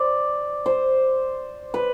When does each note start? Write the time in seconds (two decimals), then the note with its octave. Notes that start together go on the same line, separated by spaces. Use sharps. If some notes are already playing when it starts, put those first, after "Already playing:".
Already playing: C5 D5
0.66 C5
1.74 B4